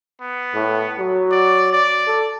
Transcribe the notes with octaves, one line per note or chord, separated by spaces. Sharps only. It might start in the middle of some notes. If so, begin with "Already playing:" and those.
B3
A2
F#3
D5
D5
A4